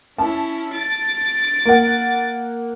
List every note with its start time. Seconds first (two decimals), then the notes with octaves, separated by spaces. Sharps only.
0.18 C#4 E4 A5
0.74 A6 D7
1.65 A#3 F#5